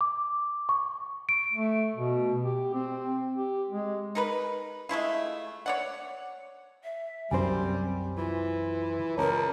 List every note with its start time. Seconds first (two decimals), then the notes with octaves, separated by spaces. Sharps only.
0.01 D6
0.69 C#6
1.29 D7
1.53 A3
1.96 B2
2.43 G4
2.74 C4
3.38 G4
3.70 G#3
4.15 D#4 A#4 B4
4.89 G#3 A3 E4 F4
5.66 C#5 D5 F#5
6.84 E5
7.31 C2 F#2 G3 C4 C5 G#5
8.17 E3 F4
9.17 C#2 A#4 C#5 A5 A#5